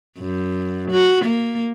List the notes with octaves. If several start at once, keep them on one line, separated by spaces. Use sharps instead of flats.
F#2
F#4
A#3